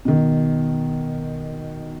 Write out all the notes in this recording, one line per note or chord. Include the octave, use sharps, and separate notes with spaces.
B2 D#3